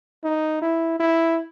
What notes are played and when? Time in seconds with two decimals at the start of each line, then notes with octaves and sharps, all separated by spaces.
0.24 D#4
0.62 E4
1.00 E4